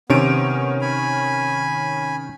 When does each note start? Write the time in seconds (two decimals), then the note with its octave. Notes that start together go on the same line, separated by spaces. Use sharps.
0.10 C3 D#3 B3 C#4 D7
0.81 G#5 B5